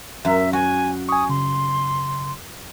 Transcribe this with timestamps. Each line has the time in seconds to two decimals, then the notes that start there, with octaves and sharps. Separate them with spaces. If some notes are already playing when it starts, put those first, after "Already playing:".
0.25 F#2 E5
0.53 F#4 G#5
1.09 G#5 C#6 D#6
1.29 C#3 C6